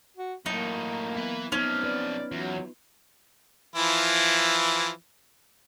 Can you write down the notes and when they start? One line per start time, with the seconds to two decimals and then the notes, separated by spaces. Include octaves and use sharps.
0.17 F#4
0.46 F#2 A2 F#3 A#3 D#4
1.16 F#3 B3 E4 B4
1.52 C3 F3 B3 C#4 D#4
1.84 B4 D5
2.32 E2 F#3 F4
3.76 E3 F3 E4